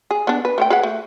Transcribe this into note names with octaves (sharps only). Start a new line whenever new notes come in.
G#4
B3 D4
B4
A3 C5 G5
G#4 B4 F#5
A3